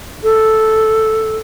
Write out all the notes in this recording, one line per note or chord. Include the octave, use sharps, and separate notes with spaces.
A4